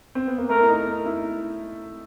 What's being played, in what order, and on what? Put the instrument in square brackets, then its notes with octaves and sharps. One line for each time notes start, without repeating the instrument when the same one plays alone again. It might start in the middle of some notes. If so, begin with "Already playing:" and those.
[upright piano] C4
B3
A#3
[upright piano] A3 [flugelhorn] A#4
[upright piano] E4
D#4
D#4
E4